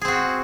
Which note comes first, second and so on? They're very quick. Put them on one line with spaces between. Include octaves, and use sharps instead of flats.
G#4 C4 F#4